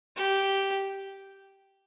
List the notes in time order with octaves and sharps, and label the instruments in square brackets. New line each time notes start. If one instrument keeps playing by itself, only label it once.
[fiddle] G4